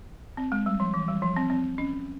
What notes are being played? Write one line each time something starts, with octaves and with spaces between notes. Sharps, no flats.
C4
G#3
G3
F3
E3
G3
F3
C4
C4
C#4